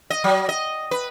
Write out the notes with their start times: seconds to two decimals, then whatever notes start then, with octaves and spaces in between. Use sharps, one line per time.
0.10 D#5
0.24 F#3
0.49 D#5
0.91 B4